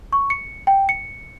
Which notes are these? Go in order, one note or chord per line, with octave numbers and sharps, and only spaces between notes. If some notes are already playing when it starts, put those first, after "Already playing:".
C#6
C#7
G5
C#7